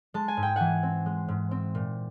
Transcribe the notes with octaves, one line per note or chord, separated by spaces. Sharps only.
G#3 A5
G#5
G#2
G5
E3 F#5 G#5
C4
G#3
G#2
C4
A#2